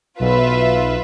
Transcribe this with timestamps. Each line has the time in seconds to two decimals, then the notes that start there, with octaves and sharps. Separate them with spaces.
0.20 B1 F4 B4 E5